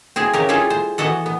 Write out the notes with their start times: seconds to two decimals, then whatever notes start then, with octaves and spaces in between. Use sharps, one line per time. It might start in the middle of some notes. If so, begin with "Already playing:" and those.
0.16 C4 E4 G#4
0.33 C#3 G4 A#4
0.49 G3 E4 F4 G#4 A4
0.70 C5
0.98 E3 B3 F#4 A4 F#5
1.26 B3